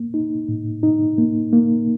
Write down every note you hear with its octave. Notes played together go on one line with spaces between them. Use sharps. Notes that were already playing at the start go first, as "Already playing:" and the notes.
Already playing: A#3
D#4
A2
D#4
A#3
A#3